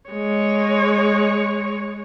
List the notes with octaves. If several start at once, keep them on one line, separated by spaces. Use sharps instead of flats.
G#3 C#5